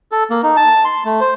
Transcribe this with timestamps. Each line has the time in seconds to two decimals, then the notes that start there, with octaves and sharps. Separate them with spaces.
0.12 A4
0.30 A#3
0.43 D#4
0.57 A5
0.85 C6
1.05 A3
1.20 C5